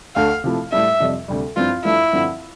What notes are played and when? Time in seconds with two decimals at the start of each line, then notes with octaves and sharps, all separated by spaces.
0.16 D2 D3 A3 F5
0.44 C3 F3 A3 E4
0.72 A2 G3 D4 E5
1.00 F2 C3 G3 D4
1.28 D2 C3 G3
1.56 G2 F3 C4 E4 F4
1.85 G2 F3 A3 E4
2.13 G2 D3 F3 C4